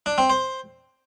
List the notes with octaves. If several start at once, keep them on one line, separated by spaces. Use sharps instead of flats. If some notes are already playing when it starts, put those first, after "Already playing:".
D4
C4
C5